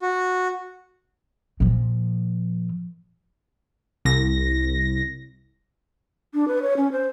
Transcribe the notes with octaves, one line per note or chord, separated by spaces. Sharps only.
F#4
A#2 F3
C2 A#6
D4
B4
C#5
C#4
C5